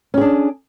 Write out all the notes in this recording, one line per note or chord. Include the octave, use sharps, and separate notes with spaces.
C#4 D4 G#4